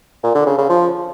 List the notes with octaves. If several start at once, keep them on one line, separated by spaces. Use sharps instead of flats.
A#2
D3
C#3
C#3
F3